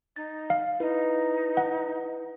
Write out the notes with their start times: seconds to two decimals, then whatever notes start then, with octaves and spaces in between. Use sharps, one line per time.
0.16 D#4 A6
0.50 F5
0.80 D#4 E4 B4
1.57 F#5